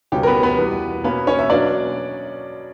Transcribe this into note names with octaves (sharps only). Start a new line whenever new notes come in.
C#2 B2 G3 C#4 G4
A#4
B3 B4
B3 B4
E2 B2 G3
B2 A#3 B3 C#4 B4
C#4 C#5
E5
B2 F#3 A#3 C#4 D4 D5